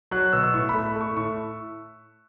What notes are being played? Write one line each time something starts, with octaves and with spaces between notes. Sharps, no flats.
F#3 F#6
B2 E6
E6
A2 C#6
B5
A3
A3 C#6
A2 C#6